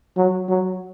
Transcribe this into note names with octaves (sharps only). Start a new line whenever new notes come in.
F#3
F#3